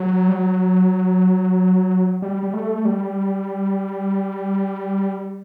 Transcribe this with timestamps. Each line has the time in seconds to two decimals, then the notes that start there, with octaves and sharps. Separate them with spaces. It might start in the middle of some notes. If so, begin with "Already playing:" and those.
Already playing: F#3
0.28 G3
0.33 F#3
2.22 G3
2.43 G3
2.53 A3
2.85 G3